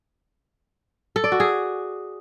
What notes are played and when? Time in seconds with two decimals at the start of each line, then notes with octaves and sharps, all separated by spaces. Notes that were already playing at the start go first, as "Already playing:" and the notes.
1.16 A4
1.24 D5
1.32 F#4
1.40 G#4